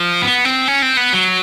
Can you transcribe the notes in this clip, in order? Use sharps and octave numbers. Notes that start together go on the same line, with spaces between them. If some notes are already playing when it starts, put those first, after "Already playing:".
Already playing: F3
B3
C4
C#4
C4
B3
F#3